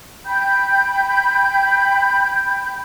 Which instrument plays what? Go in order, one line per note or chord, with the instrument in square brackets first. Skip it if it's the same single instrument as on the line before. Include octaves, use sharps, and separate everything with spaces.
[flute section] G5 B5 G6